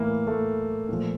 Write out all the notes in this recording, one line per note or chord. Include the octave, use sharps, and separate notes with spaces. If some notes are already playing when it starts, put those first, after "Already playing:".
Already playing: A2 E3 A#3
A3
A#2 F3